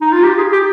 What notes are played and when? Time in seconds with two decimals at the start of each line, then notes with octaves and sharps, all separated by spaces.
0.01 D#4
0.13 F4
0.23 G4
0.38 G#4
0.52 G4